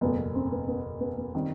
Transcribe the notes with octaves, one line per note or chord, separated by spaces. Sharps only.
F#1 E2 B2 A3 B3
C4
B3
B3
B3
B3
D#3 G3 C4